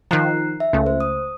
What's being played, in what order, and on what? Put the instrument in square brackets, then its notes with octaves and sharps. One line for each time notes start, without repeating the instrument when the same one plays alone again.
[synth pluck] D#3 F3 [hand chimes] A#5 F#6 C7
[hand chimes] E5
[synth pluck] C#2 A3
[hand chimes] C5
D#6